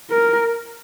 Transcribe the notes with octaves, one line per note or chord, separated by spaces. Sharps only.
A#4